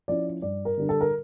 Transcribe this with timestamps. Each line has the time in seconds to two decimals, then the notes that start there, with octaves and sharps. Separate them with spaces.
0.08 F3 C#4 E4 D5
0.42 G2 D5
0.65 A#4
0.77 D3 G3 D4
0.89 A4
1.01 A#4